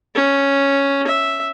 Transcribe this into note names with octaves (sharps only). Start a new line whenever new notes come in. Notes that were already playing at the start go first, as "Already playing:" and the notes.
C#4
E5